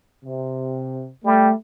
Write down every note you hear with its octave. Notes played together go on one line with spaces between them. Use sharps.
C3
G3 A3